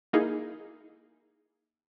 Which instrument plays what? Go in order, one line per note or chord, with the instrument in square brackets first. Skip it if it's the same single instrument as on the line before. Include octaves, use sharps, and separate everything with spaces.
[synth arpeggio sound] A#3 D#4 E4 G#4